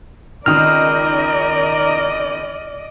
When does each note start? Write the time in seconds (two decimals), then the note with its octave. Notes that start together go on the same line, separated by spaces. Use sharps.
0.46 C#2 D#3 A#4 D5 D#5 D#6 F6